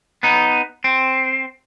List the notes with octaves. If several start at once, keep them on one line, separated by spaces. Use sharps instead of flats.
B3 D#4
C4